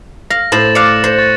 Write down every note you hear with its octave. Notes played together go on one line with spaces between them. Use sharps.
F5 A#6
A2 C5 A6 E7 F#7
D5 F5 F#6 C#7
C5
C#6 A6